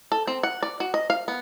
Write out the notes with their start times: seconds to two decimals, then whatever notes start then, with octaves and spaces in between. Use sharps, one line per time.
0.12 A4
0.28 C4
0.43 F#5
0.63 D5
0.80 F#4
0.94 D#5
1.10 F5
1.28 B3